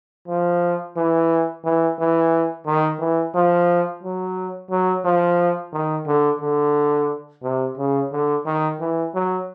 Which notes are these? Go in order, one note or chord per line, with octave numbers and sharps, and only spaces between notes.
F3
E3
E3
E3
D#3
E3
F3
F#3
F#3
F3
D#3
D3
D3
C3
C#3
D3
D#3
E3
F#3